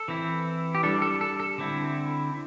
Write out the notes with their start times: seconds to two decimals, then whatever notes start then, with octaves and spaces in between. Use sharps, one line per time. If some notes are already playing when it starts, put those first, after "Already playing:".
Already playing: A4
0.08 E3 C4 E4
0.75 G4
0.83 G3 D4 A4
1.02 A4
1.21 A4
1.40 A4
1.58 D3 C4 E4